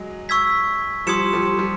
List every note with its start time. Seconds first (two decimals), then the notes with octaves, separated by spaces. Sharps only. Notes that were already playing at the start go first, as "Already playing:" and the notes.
Already playing: F#3 G#3
0.29 C#6 E6 G#6 B6
1.06 F3 G3 C6 D#6 G#6 C#7 E7
1.33 F3 G3
1.59 F3 G3